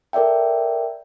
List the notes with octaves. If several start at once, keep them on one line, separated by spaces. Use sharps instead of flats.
A4 A#4 D5 E5 G5